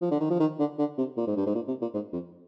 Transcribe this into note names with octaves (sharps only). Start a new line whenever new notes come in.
F3
D3
D#3
F3
D#3
D3
D3
C3
A#2
G#2
G2
G#2
A#2
C3
A#2
G#2
F2